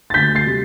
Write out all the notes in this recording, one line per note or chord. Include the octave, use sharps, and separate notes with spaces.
A6
D2 G6 B6
A6 C7
C3 G3